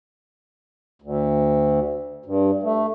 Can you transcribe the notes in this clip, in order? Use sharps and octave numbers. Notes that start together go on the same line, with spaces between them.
D2
G2
A3